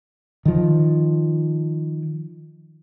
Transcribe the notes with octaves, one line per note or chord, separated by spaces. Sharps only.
D#3 F3